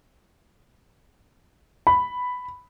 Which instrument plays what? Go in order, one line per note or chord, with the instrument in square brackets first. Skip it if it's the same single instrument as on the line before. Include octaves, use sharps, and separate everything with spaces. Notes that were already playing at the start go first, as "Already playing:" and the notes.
[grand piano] B5